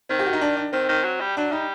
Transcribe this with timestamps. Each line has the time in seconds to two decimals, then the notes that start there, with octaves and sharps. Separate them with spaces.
0.09 D#3 C4
0.19 G4
0.26 F#4
0.33 D#4
0.41 D4
0.57 D4
0.73 D#3 C4
0.88 D#3
1.04 F#3
1.20 G3
1.37 F#3 D4
1.52 G3 D#4